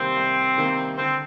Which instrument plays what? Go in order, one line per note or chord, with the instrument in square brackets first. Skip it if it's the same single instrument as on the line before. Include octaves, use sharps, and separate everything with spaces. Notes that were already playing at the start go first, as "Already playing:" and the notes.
Already playing: [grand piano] C2 C3 D#3 G3 A#3 [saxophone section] C4
[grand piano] C2
C3 D#3 G3 A#3
[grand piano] D3 [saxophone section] C4